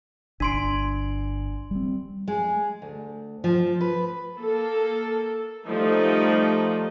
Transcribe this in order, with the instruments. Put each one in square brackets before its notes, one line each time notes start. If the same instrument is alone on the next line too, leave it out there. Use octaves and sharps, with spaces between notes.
[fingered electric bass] G1 [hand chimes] D4 C6 D7
[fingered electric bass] G3 C4
[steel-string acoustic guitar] G#3
D2
F3
B4
[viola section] A#3 A4
F3 G3 A3 D#4